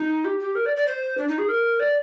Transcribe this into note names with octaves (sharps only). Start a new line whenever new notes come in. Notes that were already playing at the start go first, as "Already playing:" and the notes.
Already playing: D#4
G4
G4
A#4
D5
D5
C5
D4
D#4
G#4
A#4
D5